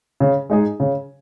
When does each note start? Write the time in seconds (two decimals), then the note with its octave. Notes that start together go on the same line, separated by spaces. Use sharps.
0.20 C#3
0.50 G#3 D#4 G#4
0.80 C#3